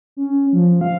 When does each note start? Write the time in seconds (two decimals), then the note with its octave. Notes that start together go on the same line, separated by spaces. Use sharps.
0.17 C#4
0.53 F3
0.81 F5